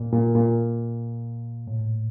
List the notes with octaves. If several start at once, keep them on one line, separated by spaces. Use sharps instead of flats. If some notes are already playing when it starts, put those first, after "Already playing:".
Already playing: A#2
A#2
A#2
A2